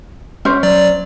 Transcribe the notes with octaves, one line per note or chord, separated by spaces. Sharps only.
C#4 C5
F#3 D5